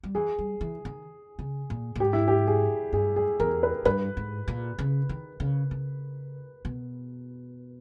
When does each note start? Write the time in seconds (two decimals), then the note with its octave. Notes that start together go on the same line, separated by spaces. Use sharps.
0.03 G3
0.15 E3 G#4
0.38 G3
0.61 E3
0.85 D#3
1.39 C#3
1.70 A#2
1.95 A#2
2.00 G#2 G4
2.13 E4
2.28 G4
2.47 G#4
2.93 G2 G#4
3.16 G#4
3.40 E2 A#4
3.63 B4
3.85 G2 B4
4.17 G#2
4.48 A#2
4.78 C#3
5.09 D#3
5.40 C#3
5.71 C#3
6.65 B2